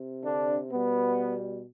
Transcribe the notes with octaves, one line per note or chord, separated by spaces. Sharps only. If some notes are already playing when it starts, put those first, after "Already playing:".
Already playing: C3
D3 D4
B2 G3 B3